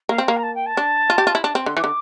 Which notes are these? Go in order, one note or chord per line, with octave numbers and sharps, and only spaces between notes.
A#3 F5
C4
A#3 F5
A#5
A5
G5
A5
D4
F4
G4
F4
E4
D4 A5
C4
D3 C6
E3 D6
D3